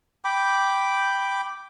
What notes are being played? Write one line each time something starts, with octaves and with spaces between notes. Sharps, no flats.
G5 B5 D6